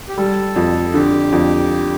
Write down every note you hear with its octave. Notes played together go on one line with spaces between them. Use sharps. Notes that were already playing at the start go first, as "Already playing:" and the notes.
G4
G3 A4
F2
D3 G4
F2